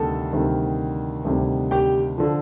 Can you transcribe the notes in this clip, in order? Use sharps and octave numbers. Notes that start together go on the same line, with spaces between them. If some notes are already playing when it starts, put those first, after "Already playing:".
Already playing: D2 C3 D#3 G3 A4 A5
D2 C3 D#3 G3
D2 C3 D#3 G3
G4 G5
D3 F3